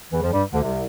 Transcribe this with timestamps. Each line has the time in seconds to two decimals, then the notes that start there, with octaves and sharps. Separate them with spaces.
0.13 E2 E3
0.23 F2 F3
0.33 G2 G3
0.53 D2 D3
0.62 C2 C3